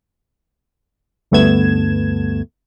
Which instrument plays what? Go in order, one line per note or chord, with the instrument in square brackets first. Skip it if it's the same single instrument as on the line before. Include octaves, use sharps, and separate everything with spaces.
[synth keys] D2 G2 A3 B3 G#6 E7